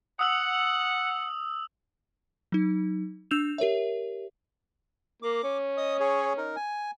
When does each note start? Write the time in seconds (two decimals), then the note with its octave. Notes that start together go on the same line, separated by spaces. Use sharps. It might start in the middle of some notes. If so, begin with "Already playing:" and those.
0.19 F#5 D#6 E6 F#7
2.52 F#3 D#4
3.31 D4 E6 G6 E7 F7
3.58 G4 A#4 C#5 E5
5.22 A#3 D6
5.44 C#4
5.77 D#5 D#6
6.00 G#4 C#5
6.37 D#4 A#4
6.56 G#5